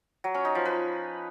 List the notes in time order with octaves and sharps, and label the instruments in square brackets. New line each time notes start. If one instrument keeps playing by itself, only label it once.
[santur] F#3
C#4
D#4
F3
B4